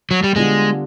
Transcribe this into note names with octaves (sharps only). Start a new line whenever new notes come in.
F#3
G3
D3 G3 G#3 B3 D4 F4